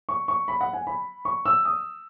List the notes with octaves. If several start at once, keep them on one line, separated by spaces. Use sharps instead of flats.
C#6
C#6
B5
F#5
G#5
B5
C#6
E6
D#6